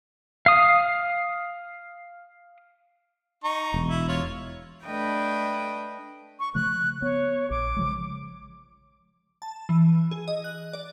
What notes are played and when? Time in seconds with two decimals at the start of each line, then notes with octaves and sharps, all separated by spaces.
0.46 F5 D#6
3.44 D#4 A#5 C#6
3.74 E1
3.89 E4
4.09 F4 C#5
4.84 A3 D4 B4 D#5 G5
6.40 C#6
6.55 C#3 F3 A3 F#6
7.02 B3 C#5
7.51 A#1 D6
7.76 C#3 F3 G#3
9.42 A5
9.69 E3
10.11 G#4
10.28 D#5
10.44 F#6
10.73 D5